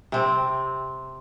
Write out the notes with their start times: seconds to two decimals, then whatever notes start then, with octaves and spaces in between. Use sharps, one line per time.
0.12 C3 C4